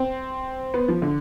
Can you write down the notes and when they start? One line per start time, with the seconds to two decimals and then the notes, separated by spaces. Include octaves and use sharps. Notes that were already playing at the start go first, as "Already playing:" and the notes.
Already playing: C4
0.74 B3
0.88 F3
1.02 D3